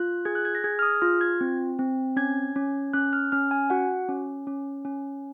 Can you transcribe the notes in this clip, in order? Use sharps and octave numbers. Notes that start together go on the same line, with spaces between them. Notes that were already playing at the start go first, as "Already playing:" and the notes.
Already playing: F4 F#6
G#4 G#6
F#6
G#6
A#6
G#4 G#6
F6
D#6
F4 F6
G#6
C4
C4
C#4 G#6
C#4
C#4 F#6
F6
C#4 F6
G#5
F#4 F#5
C#4
C#4
C#4